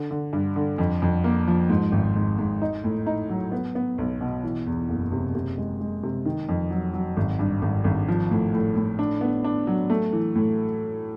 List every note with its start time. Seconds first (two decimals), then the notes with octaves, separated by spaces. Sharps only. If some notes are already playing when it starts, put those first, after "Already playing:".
Already playing: D3
0.11 D3
0.33 G2
0.56 D3
0.78 F2
1.02 F2
1.24 A#3
1.48 F3
1.69 G#2
1.92 G#1
2.16 G#2
2.38 G#2
2.62 D#4
2.84 A2
3.07 D#4
3.29 F#3
3.52 B3
3.75 B3
3.98 B1
4.21 B2
4.43 E3
4.67 E2
4.89 F#1
5.12 C3
5.35 C3
5.58 G#3
5.80 G#3
6.03 C3
6.25 D#3
6.49 F2
6.71 F#3
6.93 F#3
7.17 G#1
7.39 G2
7.62 G#1
7.84 G#1
8.08 F3
8.31 A2
8.54 A2
8.76 A2
8.99 D4
9.21 B3
9.44 D4
9.67 F#3
9.90 A3
10.13 E3
10.35 A2